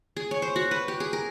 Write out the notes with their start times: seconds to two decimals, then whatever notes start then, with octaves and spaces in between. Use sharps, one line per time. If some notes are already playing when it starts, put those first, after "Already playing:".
0.17 G#4
0.31 C#5
0.42 C5
0.56 F#4
0.71 B4
0.88 G4
1.00 G#4
1.13 A#4